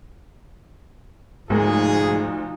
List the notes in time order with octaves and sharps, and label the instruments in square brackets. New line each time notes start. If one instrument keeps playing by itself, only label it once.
[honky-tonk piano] D2 [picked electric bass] G#2 A#3 [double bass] F3 D#4 [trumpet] G#4